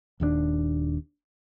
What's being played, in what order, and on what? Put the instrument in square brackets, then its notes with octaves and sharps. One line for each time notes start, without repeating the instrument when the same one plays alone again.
[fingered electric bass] D#1 D#2 E3 D4